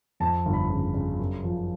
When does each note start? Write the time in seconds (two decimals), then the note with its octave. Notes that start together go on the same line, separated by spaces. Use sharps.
0.20 F2 A5
0.45 G1
0.53 B5
0.70 C#3
0.94 C#3
1.19 F#2
1.44 F3